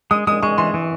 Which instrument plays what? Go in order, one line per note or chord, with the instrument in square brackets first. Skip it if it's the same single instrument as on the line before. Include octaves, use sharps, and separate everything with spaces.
[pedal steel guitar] G#3 [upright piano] D#6
[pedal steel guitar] G#3 [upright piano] D#6
[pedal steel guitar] G#3 [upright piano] C#6
[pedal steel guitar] E3 [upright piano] C6
[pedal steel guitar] E3